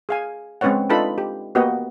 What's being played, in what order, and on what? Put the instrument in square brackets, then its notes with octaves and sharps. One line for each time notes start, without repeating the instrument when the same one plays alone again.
[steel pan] G#4 F5 G#5
G#3 C4 C#4 B4 C#5 F#5
D4 D#4 F4 A4 B4 B5
G4
A#3 B3 F#4 G4 D#5 F#5